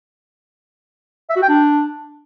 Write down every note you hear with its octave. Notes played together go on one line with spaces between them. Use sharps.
E5
F#4
G5
D4